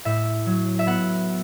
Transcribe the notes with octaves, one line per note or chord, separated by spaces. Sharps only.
A2 E5
F#3
E5
B3 F#5